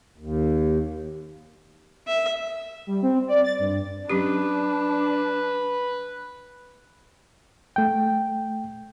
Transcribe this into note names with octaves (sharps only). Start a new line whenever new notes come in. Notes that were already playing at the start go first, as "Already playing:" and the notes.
D#2
E5
G3
C4
D5
A6
G2
F#3 C#4 D4 G4 B4
A3 G5